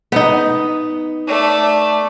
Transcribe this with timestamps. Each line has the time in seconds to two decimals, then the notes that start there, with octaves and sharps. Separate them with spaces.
0.12 B3 D#4
1.27 A3 D5